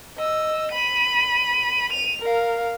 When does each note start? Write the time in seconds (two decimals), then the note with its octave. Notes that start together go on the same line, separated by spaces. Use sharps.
0.17 D#5 E6
0.72 B5 D#7
1.91 D#7 F7
2.22 A#4 F5